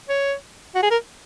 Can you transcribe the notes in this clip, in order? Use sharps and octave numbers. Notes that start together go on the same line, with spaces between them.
C#5
F#4
G#4
A#4